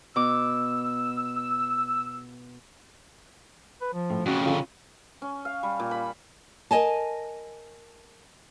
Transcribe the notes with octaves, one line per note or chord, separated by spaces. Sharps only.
B2 D6 E6
B4
F3
A2
F2 C#3 C#4 F#4
D3 C#4 F4
C#4
F5
G3
A#2
B5
A#4 D5 D#5 G#5 A5